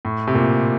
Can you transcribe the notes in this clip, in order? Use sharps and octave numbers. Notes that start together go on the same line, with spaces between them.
A2
C3
A#2